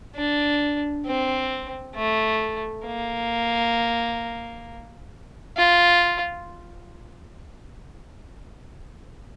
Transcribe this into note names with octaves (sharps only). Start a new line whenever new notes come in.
D4
C4
A3
A#3
F4